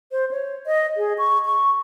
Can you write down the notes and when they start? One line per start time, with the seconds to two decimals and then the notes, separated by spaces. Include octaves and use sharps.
0.12 C5
0.31 C#5
0.66 D#5
0.97 G#4
1.18 C#6
1.45 C#6